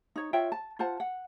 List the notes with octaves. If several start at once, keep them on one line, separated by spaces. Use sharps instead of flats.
D#4 C#5
F4 C#5 E5 G5
A5
F4 C5 F#5 A5
F#5